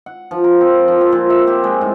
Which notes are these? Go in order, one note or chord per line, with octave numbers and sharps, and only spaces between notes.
F#5
F3
A#4
C4
F3
C4
A#2
E5
G4
G#3
A2